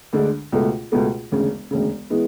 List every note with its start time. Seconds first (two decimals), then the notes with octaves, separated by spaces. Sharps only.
0.13 D2 D3 G#3 D4
0.52 C#2 B2 A3
0.92 C#2 B2 A3
1.32 E1 D2 C#3
1.71 E1 D2 C#3
2.10 E3 G#3 B3